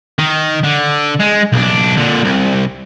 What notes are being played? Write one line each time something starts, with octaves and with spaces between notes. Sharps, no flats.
D#3
D3
G#3
B1 D4
A#2 D3
C2